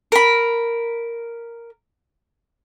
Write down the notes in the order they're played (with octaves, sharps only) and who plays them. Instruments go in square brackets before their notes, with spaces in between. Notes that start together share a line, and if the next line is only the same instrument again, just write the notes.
[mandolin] A#4 B5